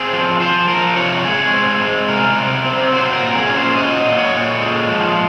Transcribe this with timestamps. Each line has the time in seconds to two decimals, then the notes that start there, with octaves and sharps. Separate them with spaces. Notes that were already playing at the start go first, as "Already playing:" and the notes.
Already playing: C4 G#4
0.13 F3
0.40 F3 C5
0.68 F3 A#4
0.96 C3 C#5
1.24 G#3 G#4
1.53 C4
1.81 G#3
2.09 C3 A#4
2.36 C3
2.65 C4
2.92 F#3 C5
3.13 A#4
3.21 A#2
3.35 G#4
3.49 C#4
3.56 C5
3.76 F#3 D#5
4.05 A#2
4.18 C#5
4.33 A#2
4.60 G#3
4.88 F3